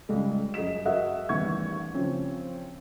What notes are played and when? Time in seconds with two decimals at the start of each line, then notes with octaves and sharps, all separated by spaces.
0.09 C#2 G3 G#3
0.54 F#2 G#4 D#5 B6 E7
0.85 F#4 G#4 A#4 D#5 E5 F#5
1.29 A1 D#2 G3 B3 C#6 G#6
1.94 C#3 F3 C4 C#4